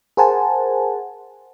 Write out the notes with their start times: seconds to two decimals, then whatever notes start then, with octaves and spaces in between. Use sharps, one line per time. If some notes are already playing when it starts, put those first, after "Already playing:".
0.17 G#4 A#4 C5 F#5 G#5 A5